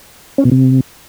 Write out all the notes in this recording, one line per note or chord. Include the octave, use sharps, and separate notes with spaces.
C#4
B2
C3